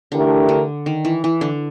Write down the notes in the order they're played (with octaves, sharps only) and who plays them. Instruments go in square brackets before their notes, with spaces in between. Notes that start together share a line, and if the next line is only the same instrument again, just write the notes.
[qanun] D3 [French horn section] E3 A3 D4 G4 A#4
[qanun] D3
D#3
E3
E3
D3